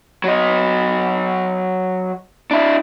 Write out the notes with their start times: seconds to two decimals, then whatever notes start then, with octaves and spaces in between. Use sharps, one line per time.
0.24 F#3 D#5
2.51 D4 E4